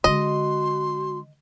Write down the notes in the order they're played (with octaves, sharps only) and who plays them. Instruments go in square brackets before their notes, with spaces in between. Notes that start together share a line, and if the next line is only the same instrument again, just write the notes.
[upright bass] D3 G#3 [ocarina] F#4 [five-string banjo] D#5 [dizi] C6